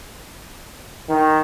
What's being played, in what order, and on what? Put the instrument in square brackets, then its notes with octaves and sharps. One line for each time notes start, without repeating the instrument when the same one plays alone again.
[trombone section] D#3